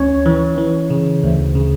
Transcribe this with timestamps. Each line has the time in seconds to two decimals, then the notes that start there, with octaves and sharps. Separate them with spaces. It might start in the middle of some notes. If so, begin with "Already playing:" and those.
Already playing: D2 C#4 C#5
0.26 E3
0.58 E3
0.90 C#3
1.23 D2
1.55 C#3